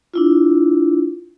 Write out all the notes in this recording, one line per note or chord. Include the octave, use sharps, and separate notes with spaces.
D4 E4 F4